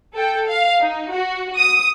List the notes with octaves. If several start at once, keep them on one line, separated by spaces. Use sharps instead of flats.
A4 G5
F5
D#4
F#4
D#6